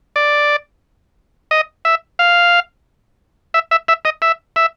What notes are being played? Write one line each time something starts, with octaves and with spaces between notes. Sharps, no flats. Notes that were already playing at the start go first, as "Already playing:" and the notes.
D5
D#5
E5
F5
E5
E5
E5
D#5
E5
E5